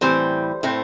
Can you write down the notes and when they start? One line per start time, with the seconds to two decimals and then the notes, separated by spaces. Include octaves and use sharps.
0.01 A2 E3 G3 C4 C5
0.63 A2 A3 C4